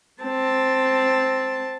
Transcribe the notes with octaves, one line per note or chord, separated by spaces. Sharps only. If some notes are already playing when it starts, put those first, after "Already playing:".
C4 A5